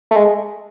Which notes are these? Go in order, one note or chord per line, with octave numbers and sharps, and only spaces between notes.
A3
G#3